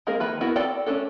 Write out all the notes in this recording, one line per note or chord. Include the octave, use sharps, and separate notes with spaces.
G#3 A#3 C4 G#4 A#4
D#3 A#3 B4 E5 B5
B3 E4 F#4 A#4 B4
C4 A4 D5 G5
A3 C#4 D4 A4